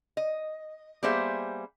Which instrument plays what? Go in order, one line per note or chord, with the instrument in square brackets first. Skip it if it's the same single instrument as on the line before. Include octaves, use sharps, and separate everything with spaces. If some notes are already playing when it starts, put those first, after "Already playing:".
[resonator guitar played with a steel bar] D#5
G3 A#3 B3 G#4 C5 E5